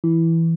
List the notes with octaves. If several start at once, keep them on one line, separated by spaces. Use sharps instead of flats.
E3